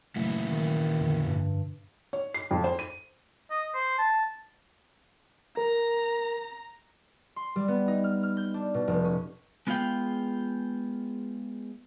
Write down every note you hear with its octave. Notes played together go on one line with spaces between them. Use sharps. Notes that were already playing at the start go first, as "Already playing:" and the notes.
A#2 C#3 E3 F#3 A3 E4
D#3
F2 B2 D3
G2
C#5
C7
F2
C5
D#7
D#5
C5
A5
A#4 A#5
C6
G3
B3
D#4
F6
F6
G6
D4
B2
F1
C#4
G#3 B3 F4 G#4 F5 G5